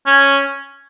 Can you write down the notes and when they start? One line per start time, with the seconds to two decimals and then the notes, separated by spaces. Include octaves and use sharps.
0.06 C#4